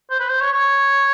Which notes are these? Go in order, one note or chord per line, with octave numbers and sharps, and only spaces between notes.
C5
B4
C5
C#5
C#5